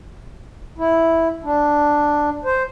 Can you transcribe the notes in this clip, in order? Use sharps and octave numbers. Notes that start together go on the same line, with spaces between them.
E4
D4
C5